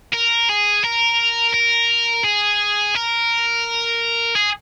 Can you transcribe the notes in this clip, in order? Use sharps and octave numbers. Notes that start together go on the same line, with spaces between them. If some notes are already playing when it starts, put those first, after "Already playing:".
A#4
G#4
A#4
A#4
G#4
A#4
G#4